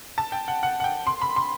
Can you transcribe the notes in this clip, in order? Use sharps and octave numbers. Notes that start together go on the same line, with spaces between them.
A5
G5
F#5
F#5
F#5
G5
C6
B5
C6